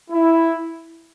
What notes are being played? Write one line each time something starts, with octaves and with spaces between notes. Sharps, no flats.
E4